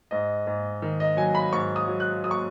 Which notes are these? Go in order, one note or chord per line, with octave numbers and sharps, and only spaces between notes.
G#2 D#5
G#2
D#3
D#5
F#3 G#5
B5
G#2 C#6
D#6
F#3
F#6
F#3 D#6
C#6